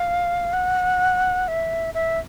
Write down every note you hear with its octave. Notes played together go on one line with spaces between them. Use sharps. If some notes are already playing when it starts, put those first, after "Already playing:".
Already playing: F5
F#5
E5
E5